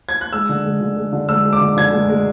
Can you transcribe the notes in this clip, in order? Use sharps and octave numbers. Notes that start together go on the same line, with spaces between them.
G#6
F#6
G#3 E6
D3
G#3
D3
G#3
D3
G#3 E6
G#3
D6
D3
D3 G#6
G#3
G#3